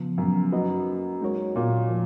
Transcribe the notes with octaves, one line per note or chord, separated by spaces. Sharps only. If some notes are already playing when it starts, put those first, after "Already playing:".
Already playing: C#3 F3 B3
F#2
A#3 D#4 F#4 B4 D#5
G#3 D#4 F#4 A#4 C#5
A#2
F3